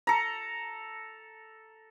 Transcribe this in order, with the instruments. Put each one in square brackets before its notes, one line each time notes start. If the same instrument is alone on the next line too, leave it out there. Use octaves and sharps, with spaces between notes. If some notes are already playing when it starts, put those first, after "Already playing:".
[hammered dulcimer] A4 A#5